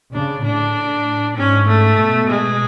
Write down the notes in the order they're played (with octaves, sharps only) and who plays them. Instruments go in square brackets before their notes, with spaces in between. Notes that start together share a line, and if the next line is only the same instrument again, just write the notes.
[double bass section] C#3 [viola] D4
[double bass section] A2 [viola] D4
[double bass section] G#2 [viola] C#4
[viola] A3
[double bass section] B2
[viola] G#3